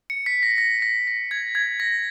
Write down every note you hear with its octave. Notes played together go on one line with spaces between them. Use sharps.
C#7
B6
A#6
A#6
A#6
A#6
G#6
G#6
A#6